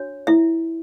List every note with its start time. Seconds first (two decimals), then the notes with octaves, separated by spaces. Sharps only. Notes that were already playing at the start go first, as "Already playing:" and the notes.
Already playing: D4 F#4 C#5
0.27 E4 E5